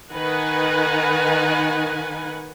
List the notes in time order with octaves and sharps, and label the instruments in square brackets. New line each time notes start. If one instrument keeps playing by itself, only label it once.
[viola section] D#3 D#4 B4 F#5 G#5